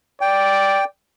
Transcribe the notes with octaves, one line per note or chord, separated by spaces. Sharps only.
D5 G5